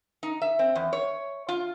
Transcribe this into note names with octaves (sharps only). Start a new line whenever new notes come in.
D#4
E5
C4
E2
C#5
F4